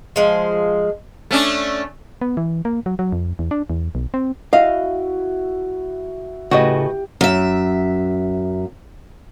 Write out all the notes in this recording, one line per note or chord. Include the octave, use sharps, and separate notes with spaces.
F3 G#3 C5
A3 C#4 D4
B3
E3
A#3
F#3
F#3
F2
E2
D4
E2
B1
C4
E4 F#4 D#5 F5 C#6
A2 C#3 F#4 G4 B4 D#5
F#2 E5